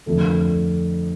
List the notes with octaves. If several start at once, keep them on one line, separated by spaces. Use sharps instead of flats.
F2 D3 A3